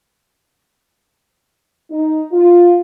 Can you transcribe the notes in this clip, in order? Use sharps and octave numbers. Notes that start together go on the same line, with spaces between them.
D#4
F4